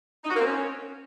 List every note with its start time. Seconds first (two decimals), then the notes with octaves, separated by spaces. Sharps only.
0.24 D#4
0.30 F#4
0.35 A#3
0.40 C4
0.46 C#4